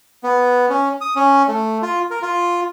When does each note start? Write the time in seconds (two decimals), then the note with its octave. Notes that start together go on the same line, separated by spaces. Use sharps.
0.24 B3
0.69 C#4
1.01 D#6
1.16 C#4
1.48 A3
1.82 F4
2.11 A#4
2.22 F4